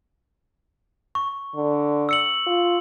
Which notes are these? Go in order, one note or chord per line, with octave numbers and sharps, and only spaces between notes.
C#6
D3
E6 C#7 F#7
F4